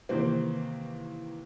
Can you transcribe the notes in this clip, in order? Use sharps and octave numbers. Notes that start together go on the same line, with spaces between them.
C3 D#3 E3 A#3 C4